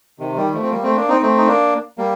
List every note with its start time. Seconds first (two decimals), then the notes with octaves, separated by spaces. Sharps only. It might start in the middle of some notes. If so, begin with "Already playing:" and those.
0.19 C3 D#3
0.36 D#3 G3
0.54 F3 A3
0.63 C4
0.70 G3 A#3
0.83 A3 C4
0.96 A#3 D4
1.09 C4 D#4
1.22 A3 C4
1.38 D#4
1.47 A#3 D4
1.98 G3 A#3